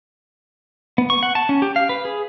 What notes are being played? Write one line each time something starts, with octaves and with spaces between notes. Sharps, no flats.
B3
C#6
F#5
A5
C#4
G4
F5
B4
G#4